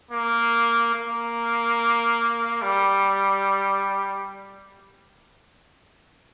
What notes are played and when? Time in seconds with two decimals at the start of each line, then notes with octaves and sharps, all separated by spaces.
0.11 A#3
0.94 A#3
2.62 G3